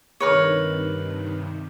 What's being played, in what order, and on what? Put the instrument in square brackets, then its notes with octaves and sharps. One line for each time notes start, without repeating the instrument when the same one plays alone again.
[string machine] G2 C3 D#3 [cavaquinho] A#4 B4 C#5